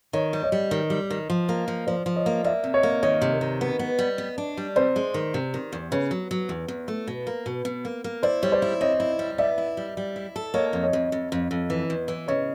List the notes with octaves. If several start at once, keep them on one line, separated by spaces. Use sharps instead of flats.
D#3 C#5 D#5
G3
C#5 D#5
G3
D#3
G3
D#3
F3
A#3
F3
F3 C5 D5
F3
C#5 D#5
A#3
A#3 D5 E5
C3
C#5 D#5
A#3
D#3 C#5 D#5
C3
D#3
B3
B3
G3
B3
D4
G3
C3 C5 D5
G#3
D#3
C3
D#3
E2
C#3 B4 C#5
F#3
F#3
E2
E2
A3
B2
A#3
B2
B2
A#3
A#3
E4 C5 D5
G3 C#5
C5 D5
E4
C4 C#5 D#5
E4
G3
B3 D5 E5
E4
G3
G3
E4
A4
A#3 C#5 D#5
F2
C#5 D#5
F2
F2
F2
F2
E3
E2
E3
C#3 C#5 D#5